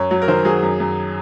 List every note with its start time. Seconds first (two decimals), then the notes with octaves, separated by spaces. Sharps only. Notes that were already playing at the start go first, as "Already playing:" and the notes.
Already playing: F#2 C#5
0.11 F#3
0.22 A#4
0.28 D#3 C5
0.45 F#3 G#4
0.62 F#2
0.80 F#2